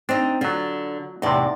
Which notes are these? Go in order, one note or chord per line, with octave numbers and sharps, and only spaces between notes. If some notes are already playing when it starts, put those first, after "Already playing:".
C4 D4 D#4
D3 F#3 F4
E2 A2 C3 D#4 D5